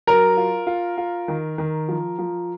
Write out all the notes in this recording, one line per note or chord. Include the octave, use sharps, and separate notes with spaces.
F#3 A#4
F4
F4
F4
D#3
D#3
F3
F3